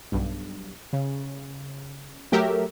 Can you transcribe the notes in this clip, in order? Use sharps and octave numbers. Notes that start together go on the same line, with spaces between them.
B1 G2
C#3
F#3 A3 G4 A#4 E5